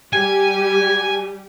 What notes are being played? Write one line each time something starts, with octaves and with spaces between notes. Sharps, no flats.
G3 G4 G#5